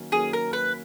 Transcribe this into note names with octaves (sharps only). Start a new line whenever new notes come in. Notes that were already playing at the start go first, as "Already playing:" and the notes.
Already playing: D#3 F#3 A#3 C#4
D#3 F#3 A#3 C#4 G#4
A#4
B4